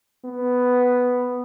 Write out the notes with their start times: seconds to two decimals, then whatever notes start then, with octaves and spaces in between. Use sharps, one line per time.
0.24 B3